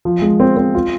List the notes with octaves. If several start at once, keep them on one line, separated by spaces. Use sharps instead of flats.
F3
G#3
C4
C4
F4